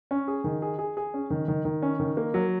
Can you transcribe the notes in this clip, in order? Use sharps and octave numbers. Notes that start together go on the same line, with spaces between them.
C#4
G#4
D#3
G#4
G#4
G#4
C#4
D#3
D#3
D#3
C#4
D#3
A#3
F#3